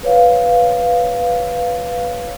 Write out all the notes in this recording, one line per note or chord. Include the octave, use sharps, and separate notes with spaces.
B4 C#5 F5